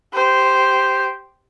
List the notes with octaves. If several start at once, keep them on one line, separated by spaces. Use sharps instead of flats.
G4 C5